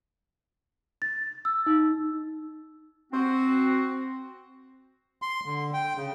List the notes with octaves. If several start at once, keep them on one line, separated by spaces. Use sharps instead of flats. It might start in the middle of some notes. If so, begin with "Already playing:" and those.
A6
E6
D#4
C4 F#4
C6
D3
G5
C#3